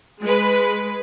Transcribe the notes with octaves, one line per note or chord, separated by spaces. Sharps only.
G#3 B4